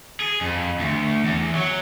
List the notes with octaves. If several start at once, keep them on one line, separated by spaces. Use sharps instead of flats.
G#4
F2
D2
E2
F#3